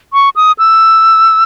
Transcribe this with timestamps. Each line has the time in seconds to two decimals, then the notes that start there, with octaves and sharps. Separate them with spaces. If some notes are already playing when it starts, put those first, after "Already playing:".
0.13 C#6
0.36 D#6
0.59 E6